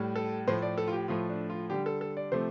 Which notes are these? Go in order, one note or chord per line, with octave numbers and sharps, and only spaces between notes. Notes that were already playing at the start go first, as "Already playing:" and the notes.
Already playing: A2 G3
A4
A2 F3 A3 C5
D5
A4
F4
G4
A2 F3 A3 F4
D4
F4
D3 G3 G4
A4
A4
D5
C3 F3 A3 C5